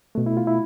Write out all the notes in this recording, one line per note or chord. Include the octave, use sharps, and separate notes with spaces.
B2 A3
E4
F4
E4